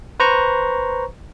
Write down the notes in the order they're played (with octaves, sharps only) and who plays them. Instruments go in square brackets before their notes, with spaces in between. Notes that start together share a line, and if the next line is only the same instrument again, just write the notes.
[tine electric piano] B4 C5 A#5 C#6